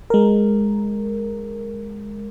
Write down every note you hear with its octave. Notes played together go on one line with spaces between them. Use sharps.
G#3 A#4